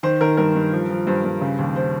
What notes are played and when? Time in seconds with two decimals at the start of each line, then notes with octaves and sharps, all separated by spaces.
0.03 D#3 C5
0.20 D#3 A#4
0.37 G2 A#4
0.55 G2
0.72 F3
0.90 F3
1.07 G2 C5
1.24 G2
1.41 C#3
1.59 D#2
1.76 C5